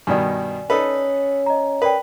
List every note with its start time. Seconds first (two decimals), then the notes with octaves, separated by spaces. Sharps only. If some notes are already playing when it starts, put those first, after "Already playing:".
0.07 G2 B2 D#3 D5 G#5
0.70 C#4 D#4 A4 B4
1.46 D#5 A#5
1.82 A#4 B4 D5 G5